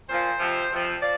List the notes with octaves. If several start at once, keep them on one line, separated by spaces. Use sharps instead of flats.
A#2 F3 C5
F2 C3 F3
F2 C3 F3
F3 D5